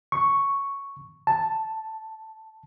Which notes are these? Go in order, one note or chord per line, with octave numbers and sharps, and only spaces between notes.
C#6
A5